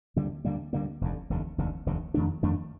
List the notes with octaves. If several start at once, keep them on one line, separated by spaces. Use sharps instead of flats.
D2 D3 G3 A#3
D2 D3 G3 A#3
D2 D3 G3 A#3
F1 D#2 D3
F1 D#2 D3
F1 D#2 D3
F1 D#2 D3
F2 D#3 A3 D4
F2 D#3 A3 D4